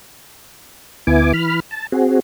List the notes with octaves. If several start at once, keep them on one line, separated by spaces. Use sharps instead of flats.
D2 B3 E4 G#5 D6
E3 B5 F6
A5
C4 F#4 G#4